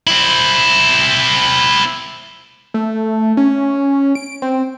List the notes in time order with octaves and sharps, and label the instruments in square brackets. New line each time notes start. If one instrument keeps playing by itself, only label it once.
[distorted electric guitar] C4 E4
[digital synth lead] A3
C#4
D7
C4